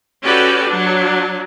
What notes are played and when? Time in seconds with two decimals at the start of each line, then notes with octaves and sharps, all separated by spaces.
0.24 C#4 F#4 G4 A4 B4 D5
0.69 F#3 D4